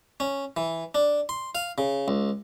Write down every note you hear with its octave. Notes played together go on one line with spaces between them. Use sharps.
C#4
E3
D4
C6
F5
C#3
C#2